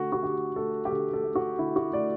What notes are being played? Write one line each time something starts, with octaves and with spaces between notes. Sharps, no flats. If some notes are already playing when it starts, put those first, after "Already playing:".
Already playing: D3 A3 F#4 A4
F#4
D3 G4
A3 A4
G4
D3 A4
A4
A3
F#4
D3 E4
F#4
A3 D5